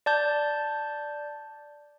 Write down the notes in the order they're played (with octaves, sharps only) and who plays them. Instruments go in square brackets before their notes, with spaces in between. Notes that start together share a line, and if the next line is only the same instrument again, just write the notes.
[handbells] D5 A5 G6